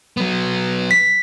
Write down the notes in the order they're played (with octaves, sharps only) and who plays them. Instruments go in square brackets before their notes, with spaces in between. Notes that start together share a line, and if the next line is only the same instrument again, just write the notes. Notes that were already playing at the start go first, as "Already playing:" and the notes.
[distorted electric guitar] F#3 B3
[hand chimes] B6